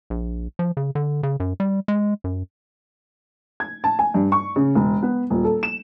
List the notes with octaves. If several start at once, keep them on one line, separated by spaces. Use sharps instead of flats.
A#1
F3
C#3
D3
C#3
F#2
G3
G#3
F#2
G#6
A5
G#5
G2
C#6
C#3
E1
B3
D#1
A4
E7